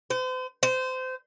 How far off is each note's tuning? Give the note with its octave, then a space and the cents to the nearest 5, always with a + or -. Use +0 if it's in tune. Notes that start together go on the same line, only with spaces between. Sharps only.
C5 -40
C5 -25